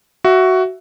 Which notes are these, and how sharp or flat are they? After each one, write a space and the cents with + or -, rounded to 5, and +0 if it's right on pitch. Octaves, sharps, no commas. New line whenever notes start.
F#4 +10 E5 +10